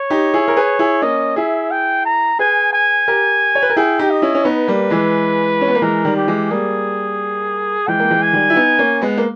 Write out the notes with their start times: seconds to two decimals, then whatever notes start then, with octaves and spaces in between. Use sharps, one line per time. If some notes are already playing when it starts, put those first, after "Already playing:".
Already playing: C#5
0.10 D#4 G4
0.34 E4 G#4
0.48 A#4
0.57 G#4 B4
0.79 E4 G#4
1.02 A#3 C#4 D#5
1.36 E4 G#4 E5
1.71 G5
2.05 A#5
2.39 G#4 B4 G#5
2.73 G#5
3.08 G4 A#4
3.55 C#5
3.62 B4
3.70 A#4
3.76 E4 G#4 G5
3.99 D#4 G4
4.11 D#5
4.22 C#4 E4
4.35 C#4
4.45 B3 D#4 B4
4.68 G3 A#3
4.90 E3 G#3
5.61 C#4
5.68 B3
5.75 A#3
5.82 E3 G#3 A#4
6.05 D#3 G3
6.16 G4
6.27 E3 G#3
6.51 G3 A#3 G#4
7.88 E3 G#3 G5
8.00 A#3
8.11 E3 G#3
8.22 G#5
8.33 D#3 G3
8.50 E4
8.56 B3 D#4
8.79 A#3 C#4
9.02 G#3 B3
9.18 A#3